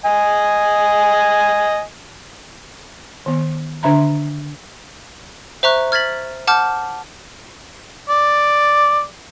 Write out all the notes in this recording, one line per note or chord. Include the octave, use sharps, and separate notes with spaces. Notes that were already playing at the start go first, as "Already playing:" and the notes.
D#5 G#5
D#3 B3
D3 D4 E5 A#5 B5
C5 E5 A#5 C#6 F#6
F6 G#6 A6 B6 F#7
F#5 A5 D6 F6 G6
D5